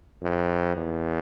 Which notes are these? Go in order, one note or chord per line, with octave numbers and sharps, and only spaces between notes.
F2
E2